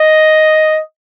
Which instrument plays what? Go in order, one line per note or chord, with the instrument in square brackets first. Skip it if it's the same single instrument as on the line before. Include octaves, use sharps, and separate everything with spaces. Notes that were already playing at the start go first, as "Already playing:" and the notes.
Already playing: [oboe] D#5